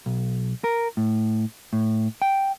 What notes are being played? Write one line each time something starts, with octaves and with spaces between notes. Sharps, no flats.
B1
A#4
A2
A2
G5